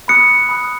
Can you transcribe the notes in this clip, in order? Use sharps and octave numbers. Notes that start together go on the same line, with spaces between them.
B5 D#6 F#6 C#7
B5 D#6 F#6